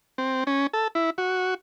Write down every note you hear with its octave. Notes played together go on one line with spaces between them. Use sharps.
C4
C#4
A4
E4
F#4